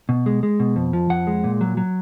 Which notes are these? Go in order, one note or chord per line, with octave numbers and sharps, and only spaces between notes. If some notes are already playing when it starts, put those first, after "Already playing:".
B2
G#3
G#3
B2
F2
F3
F2 F#5
G#3
A#2
F#3
F#3